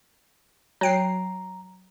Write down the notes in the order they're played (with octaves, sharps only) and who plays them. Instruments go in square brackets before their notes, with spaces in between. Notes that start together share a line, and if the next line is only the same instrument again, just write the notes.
[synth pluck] F#3 G5 C7 [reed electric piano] A#5